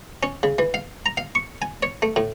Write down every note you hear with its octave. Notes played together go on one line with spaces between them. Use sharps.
C#4
C#3
E3
F5
A#5
F5
C#6
G#5
C#5
A3
A2